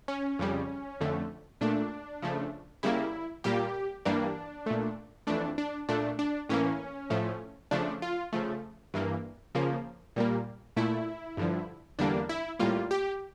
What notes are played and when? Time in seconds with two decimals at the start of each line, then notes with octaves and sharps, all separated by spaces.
0.08 C#4
0.39 F2 C#3 G3
1.01 F2 D3 A3
1.61 A#2 A3 D4
2.22 C#3 F3 A3
2.83 C#3 G3 A#3 E4
3.44 A#2 G3 A#3 G4
4.05 G2 E3 G3 A#3 D4
4.66 A#2 A3
5.27 F2 E3 A3 D4
5.58 D4
5.89 A#2 A3 D4
6.19 D4
6.49 A2 E3 A#3 C#4
7.10 A2 F3 A3
7.71 C#3 F3 A3 D4
8.02 F4
8.33 C#3 F3 A3
8.94 G2 E3 A#3
9.55 C#3 F3 A#3
10.16 A#2 G3 A#3
10.77 A#2 A3 E4
11.37 G2 D3 F3
11.99 E2 D3 G3 A#3 D4
12.29 E4
12.59 A2 G3 A#3 F4
12.91 G4